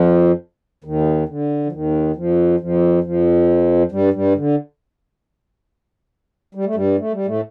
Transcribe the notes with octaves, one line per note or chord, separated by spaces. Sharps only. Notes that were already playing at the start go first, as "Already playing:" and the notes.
Already playing: F2 F3
D#2 D#3
D3
F3
D#2 D#3
F2 F3
F2 F3
F2 F3
G2 G3
G2 G3
D3
G3
A3
G2 G3
A3
G3
A2 A3